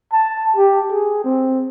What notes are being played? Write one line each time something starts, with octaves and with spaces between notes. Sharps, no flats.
A5
G4
G#4
C4